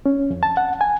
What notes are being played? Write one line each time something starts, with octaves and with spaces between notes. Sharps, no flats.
C#4
F2
A5
F#5
G#5